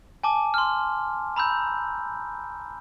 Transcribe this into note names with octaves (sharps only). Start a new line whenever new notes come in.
G#5 A5 D6
C6 F6
A#5 B5 E6 G6